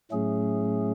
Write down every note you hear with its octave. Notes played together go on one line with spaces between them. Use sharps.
A2 F#3 A3 C#4 G#4